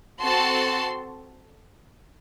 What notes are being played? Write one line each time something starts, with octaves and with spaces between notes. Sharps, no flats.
C4 F#4 A4 A5 C6